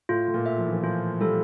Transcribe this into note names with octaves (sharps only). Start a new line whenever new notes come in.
A2 F4
A2
A#2
E5
F3
E3
F3
F3 F4
G3 A4